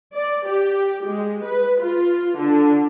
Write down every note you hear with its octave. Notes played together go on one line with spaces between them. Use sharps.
D5
G4
G#3
B4
F4
D3